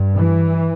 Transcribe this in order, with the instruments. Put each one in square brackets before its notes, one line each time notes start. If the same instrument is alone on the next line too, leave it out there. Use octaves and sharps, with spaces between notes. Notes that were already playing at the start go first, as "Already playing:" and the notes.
Already playing: [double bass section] G2
E3